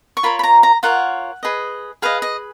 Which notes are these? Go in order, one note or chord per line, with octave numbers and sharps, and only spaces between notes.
C#6
F4 A#4 C#5 B5
B5
A#5
A#5
F4 A#4 C#5 F#5
G#4 B4 D#5
G#4 B4 D#5 F5
D#5